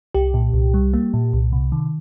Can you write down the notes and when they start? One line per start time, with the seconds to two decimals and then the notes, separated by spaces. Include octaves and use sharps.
0.15 C2 G4
0.34 A#2
0.54 C2
0.74 G3
0.94 A#3
1.14 A#2
1.33 C2
1.53 C3
1.72 D#3